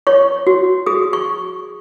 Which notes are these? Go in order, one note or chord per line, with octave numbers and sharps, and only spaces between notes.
C#5 C#6
F#4
G#4 D#6
C#6